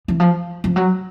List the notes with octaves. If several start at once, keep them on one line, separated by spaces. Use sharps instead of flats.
E3
F3
F3
F#3